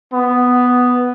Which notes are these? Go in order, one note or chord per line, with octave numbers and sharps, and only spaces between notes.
B3